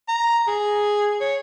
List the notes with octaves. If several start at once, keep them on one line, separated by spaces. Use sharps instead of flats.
A#5
G#4
C#5